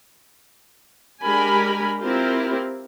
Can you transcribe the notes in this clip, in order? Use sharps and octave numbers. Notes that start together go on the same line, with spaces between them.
G#3 D4 G4 A#4 G#5 B5
C4 E4 F4 G4 A#4